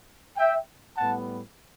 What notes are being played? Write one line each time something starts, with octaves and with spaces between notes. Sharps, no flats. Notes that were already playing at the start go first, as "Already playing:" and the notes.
E5 G5
A2 G3 B3 F#5 A5